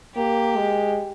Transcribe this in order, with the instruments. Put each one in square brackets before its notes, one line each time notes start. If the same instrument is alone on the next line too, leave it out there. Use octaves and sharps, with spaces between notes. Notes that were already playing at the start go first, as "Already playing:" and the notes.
[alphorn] A#3 [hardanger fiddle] G4
[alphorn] G#3